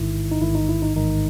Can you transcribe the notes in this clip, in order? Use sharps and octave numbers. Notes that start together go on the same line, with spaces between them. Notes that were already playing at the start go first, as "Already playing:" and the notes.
Already playing: A1 G#2 D#3 E4
D#4
A1 G#2 D#3 E4
D#4
E4
D#4
A1 G#2 D#3 D#4